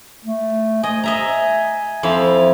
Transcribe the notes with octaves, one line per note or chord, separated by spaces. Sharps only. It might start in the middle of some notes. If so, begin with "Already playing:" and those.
A3
D#5 G#5
D#5 E5 A#5
F2 E4 F5